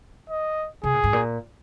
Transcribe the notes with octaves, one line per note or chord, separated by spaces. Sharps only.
D#5
C3 G#4
A#2
G#2
A#2